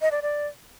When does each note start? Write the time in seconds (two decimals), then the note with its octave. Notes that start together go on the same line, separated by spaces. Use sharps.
0.01 D#5
0.11 D5
0.22 D5